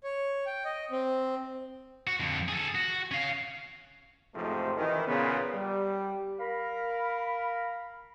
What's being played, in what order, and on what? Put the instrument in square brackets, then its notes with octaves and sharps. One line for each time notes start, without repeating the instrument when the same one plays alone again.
[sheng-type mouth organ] C#5
G5
D#5
C4
[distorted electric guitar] F#4
F2 D3
G#4 A4
F#4
C#4 F5
[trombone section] A1 F2 G#2 C3 F3 A3
D#3 E3
A#2 C#3 B3
G3
[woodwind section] A#4 F5 B5